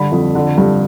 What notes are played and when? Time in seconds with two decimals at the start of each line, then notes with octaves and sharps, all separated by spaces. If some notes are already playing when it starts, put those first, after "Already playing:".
Already playing: G2 D3 B5
0.12 F2
0.35 D3
0.58 G2